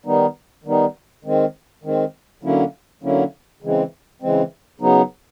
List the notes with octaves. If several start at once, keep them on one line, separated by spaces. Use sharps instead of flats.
D#3 G3 B3 D#4
D#3 G3 B3 D#4
D#3 G#3 C4
D#3 G#3 C4
D3 F#3 A#3 C#4 E4
D3 F#3 A#3 C#4 E4
C#3 E3 G#3 C4
C#3 E3 G#3 C4
C#3 F#3 B3 D#4